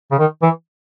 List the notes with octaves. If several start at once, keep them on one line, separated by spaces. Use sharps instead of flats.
C#3
D#3
E3